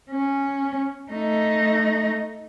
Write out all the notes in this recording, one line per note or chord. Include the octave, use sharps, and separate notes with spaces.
C#4
A3 D#4